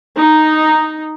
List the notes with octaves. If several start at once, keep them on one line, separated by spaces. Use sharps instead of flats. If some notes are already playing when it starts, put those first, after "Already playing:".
D#4